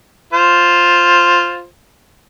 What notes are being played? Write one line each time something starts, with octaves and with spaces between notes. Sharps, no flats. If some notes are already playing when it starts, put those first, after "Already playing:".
F4 C5